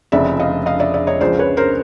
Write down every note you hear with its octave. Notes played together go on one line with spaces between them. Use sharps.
F1 F2 C#3 D5 E5
D#5 F5
D#5 F5
D5 E5
D5 E5
C#5 D#5
C#2 C#3 F3 C5 D5
B4 C#5
A#4 C5